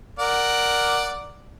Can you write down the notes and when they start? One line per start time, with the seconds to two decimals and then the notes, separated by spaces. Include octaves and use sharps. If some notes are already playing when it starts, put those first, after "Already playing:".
0.19 A#4 D5 F#5